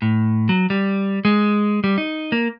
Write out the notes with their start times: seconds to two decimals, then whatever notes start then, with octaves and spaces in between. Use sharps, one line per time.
0.02 A2
0.49 F#3
0.70 G3
1.25 G#3
1.84 G3
1.98 D#4
2.32 A#3